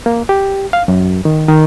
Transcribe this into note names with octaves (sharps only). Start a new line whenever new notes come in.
A#3
G4
F5
F#2
D#3
D#3